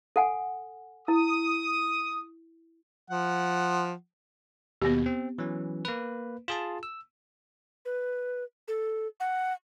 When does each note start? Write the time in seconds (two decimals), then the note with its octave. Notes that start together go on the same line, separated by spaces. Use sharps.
0.16 A4 F#5 G#5
1.08 E4 D#6
3.10 F3 F#5
4.82 D#2 B2 B3 G4
5.06 C4
5.38 E3 F#3 C#4
5.85 A#3 B4
6.48 F4 G#4 A5
6.83 E6
7.85 B4
8.68 A4
9.20 F#5